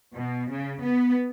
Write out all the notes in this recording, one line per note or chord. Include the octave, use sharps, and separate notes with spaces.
B2
C#3
B3